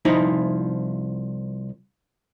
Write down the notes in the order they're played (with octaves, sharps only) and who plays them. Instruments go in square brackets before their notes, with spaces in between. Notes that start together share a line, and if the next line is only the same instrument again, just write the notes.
[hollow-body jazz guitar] C2 F3 D#4 E4 D#5